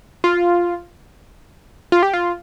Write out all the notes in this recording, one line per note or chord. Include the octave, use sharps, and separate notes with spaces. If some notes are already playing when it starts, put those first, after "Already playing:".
F4
F4
G4
F4